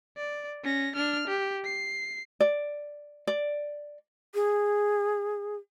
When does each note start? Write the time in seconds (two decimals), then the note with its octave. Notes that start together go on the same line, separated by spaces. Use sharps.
0.17 D5
0.64 C#4 A#6
0.96 D4 F6
1.27 G4
1.64 C7
2.40 D5
3.27 D5
4.35 G#4